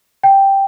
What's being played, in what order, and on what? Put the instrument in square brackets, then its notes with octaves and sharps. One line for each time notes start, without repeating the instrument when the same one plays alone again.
[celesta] G5